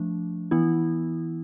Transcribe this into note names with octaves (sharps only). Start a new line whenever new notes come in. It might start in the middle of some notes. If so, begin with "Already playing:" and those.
Already playing: F3 A3 D4
E3 B3 E4